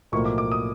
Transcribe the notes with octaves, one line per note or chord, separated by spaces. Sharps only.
B1 A2 F3 A#3 C#6
D6
D6
D#6